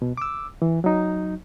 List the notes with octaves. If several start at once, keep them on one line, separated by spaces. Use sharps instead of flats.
B2
D6 E6
E3
F#3 D#4